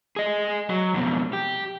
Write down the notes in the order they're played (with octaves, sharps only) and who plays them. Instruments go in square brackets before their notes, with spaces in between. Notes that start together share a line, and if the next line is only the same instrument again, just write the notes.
[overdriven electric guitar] G#4 D#5
F#3
F2 B2
G4